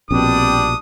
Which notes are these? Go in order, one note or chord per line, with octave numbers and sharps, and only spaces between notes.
A#1 B2 G3 C4 D4 D#6